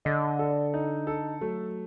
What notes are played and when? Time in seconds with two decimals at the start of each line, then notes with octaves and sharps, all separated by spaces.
0.05 D3 D#5
0.39 A4
0.74 D#4
1.07 A4
1.41 F#3 A3